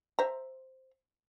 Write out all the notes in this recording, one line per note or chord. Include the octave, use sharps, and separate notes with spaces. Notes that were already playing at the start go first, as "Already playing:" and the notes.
C5 E5 A#5